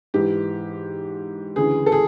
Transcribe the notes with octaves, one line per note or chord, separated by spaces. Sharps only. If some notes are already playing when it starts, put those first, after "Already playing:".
G#2 E3 G4
D2 C#3 E3 G#4
A4
G#4